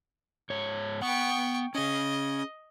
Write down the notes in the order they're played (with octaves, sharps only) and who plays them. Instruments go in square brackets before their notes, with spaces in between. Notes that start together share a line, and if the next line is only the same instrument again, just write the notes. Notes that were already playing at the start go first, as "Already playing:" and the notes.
[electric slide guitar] G#2 C#5
[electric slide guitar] B3 F#5 [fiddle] G5 C#6
[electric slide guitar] C#4 G#4 [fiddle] D#5